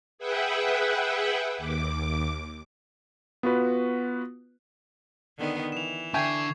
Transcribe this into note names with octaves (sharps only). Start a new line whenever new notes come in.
G#4 B4 E5 F#5 G5
D#2 D6
B3 F4 F#4 B4
D3 D#3 B3
E3 E7 F7
D3 D4 E5 G5 G#5 C#6 G#6 C7